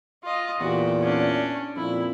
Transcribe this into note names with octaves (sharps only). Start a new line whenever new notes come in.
F4 D#5
E2 A#2 F#4 G4
C#4 D4
F2 A#2 E4